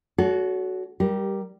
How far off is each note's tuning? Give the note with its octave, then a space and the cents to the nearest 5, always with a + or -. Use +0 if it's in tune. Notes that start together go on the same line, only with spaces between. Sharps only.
F#4 +0 A4 -35 C#5 +35
G3 +0 G4 -15 A#4 +15